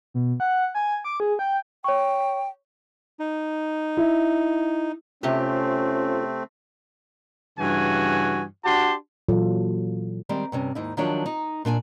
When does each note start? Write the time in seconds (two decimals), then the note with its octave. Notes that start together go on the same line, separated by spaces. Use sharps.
0.14 B2
0.40 F#5
0.75 G#5
1.04 D6
1.20 G#4
1.39 G5
1.84 C#5 G5 C#6
3.20 D#4
3.97 E4
5.23 C3 A3 C4 C#4 F4 G4 A4 C5
7.59 G2 C#3 E3 F#4 G#5
8.65 D4 F#4 G4 A5 C6
9.29 A#2 E3 F#3 F4 A4
10.29 D#3 G3 G#3 C4
10.52 G2 C3 C#4
10.75 D#2 G#2 D#4 E4
10.97 D#3 F3 F#3 D4 C#5
11.26 D#4
11.65 A#2 D4 G5 G#5